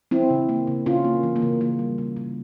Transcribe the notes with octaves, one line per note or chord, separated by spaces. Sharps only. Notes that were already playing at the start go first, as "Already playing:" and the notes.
E3 C4 E4
C#3
A#3
C#3
C#3 C#4 F4
A#3
E3
A#3
C#3
A#3
G3
C#3
C#3